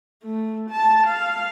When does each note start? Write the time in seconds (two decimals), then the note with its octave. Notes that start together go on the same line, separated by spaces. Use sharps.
0.23 A3
0.70 A5
1.07 F5